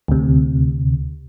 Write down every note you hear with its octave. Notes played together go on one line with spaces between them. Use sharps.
D2 C3